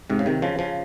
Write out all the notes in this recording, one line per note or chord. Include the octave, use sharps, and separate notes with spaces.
G#2 C3
C#3
C3 D#3
C#3 F3
C#3 F3